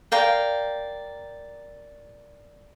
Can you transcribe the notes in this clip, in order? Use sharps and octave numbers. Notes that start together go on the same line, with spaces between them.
A#4 D5 F5 G5